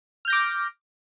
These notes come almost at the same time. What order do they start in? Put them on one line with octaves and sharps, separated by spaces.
F6 G6 A#6 D6